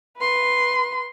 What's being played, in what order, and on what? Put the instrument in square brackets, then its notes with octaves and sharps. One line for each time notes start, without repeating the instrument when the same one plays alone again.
[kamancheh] B4 C6